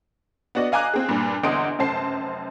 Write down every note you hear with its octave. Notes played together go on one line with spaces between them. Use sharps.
B3 D4 F#4 D5 D#5
D#5 F5 G#5 A#5 D6 F#6
C4 G#4
G2 A#2
G1 E2 D#5 C6 D#6 D7
F1 F#2 C5 A5 C7